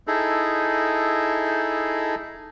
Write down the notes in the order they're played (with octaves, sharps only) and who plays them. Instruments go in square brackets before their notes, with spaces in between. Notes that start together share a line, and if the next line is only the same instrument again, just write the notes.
[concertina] D#4 E4 G#4 A4